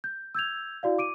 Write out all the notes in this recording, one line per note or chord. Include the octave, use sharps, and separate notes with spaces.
G6
E6 G6 G#6 F7
E4 F#4 D5 F5
D6 D7 D#7